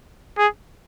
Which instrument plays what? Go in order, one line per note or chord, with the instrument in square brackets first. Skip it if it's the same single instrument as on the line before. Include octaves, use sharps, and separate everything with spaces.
[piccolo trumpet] G#4